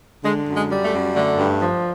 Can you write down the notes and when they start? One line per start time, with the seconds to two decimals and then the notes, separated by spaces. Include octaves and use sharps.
0.24 D3 G#3
0.48 F#2
0.55 G#3
0.70 G3
0.85 A3
0.93 F#2
1.16 D3 A3
1.38 G2
1.62 F3